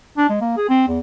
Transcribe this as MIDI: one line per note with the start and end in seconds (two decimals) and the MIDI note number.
0.18 0.27 62
0.29 0.38 56
0.41 0.56 58
0.57 0.68 68
0.69 0.85 60
0.88 0.99 40